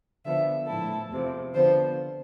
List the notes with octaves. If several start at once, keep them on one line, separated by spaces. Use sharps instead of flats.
D3 F3 B3 E5
A2 F3 A3 E4 A4
E2 C3 F3
D3 F3 B3 C5